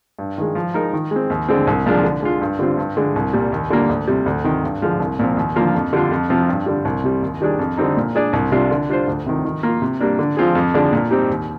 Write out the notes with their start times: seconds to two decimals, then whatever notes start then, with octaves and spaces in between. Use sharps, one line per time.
0.19 G2
0.38 D#3 G#3
0.55 F3
0.74 G#3 D#4 A#4
0.93 D#3
1.11 G#3 C4
1.30 D#2
1.48 D3 G#3 C4
1.67 C2
1.86 A#2 F3 G#3 D4
2.04 D3
2.22 G#3 D4 F4
2.41 G2
2.59 D3 G3 C4 F4
2.77 G2
2.97 D3 G#3
3.16 C2
3.33 A#2 G3
3.52 D#2
3.70 D3 G3 A#3
3.89 D2
4.08 C3 G3
4.26 D2
4.44 C3 D#3
4.64 G2
4.82 D3 F3 G#3
5.00 C2
5.19 A#2 F3 C4
5.37 D#2
5.56 D3 F3 A#3 F4
5.75 F2
5.93 D3 G3 D4 F4
6.11 F2
6.30 C3 F3 C4
6.49 G2
6.66 D3 G3
6.85 C2
7.04 C3 G3
7.22 D#2
7.41 D#3 G3 D4 G#4
7.59 F2
7.77 D3 G3 C4 D#4
7.97 A#2
8.15 G#3 D4 G#4 D5
8.33 C2
8.52 C3 G3 D4 F4
8.71 D3
8.90 G3 D4 F4 C5
9.07 D2
9.26 C3 D#3
9.45 D#3
9.63 A#3 F4
9.82 C3
10.00 G3 A#3 D4
10.19 D3
10.37 F3 C4 F4 G#4
10.55 F2
10.74 D3 F3 G#3 D4
10.93 A#2
11.11 G3 C4 D#4 G4
11.30 D#2